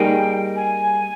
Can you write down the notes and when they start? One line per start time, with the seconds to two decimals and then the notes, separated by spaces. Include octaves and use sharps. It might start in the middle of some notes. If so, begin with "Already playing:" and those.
Already playing: G3 A#3 D#4 G#4 G5
0.56 G#5